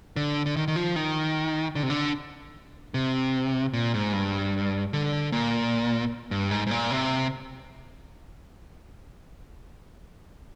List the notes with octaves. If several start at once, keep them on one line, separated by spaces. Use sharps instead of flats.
D3
D3
D#3
D#3
F3
D#3
D3
C3
D3
C3
A#2
G#2
G2
D3
A#2
G2
G#2
G#2
A#2
C3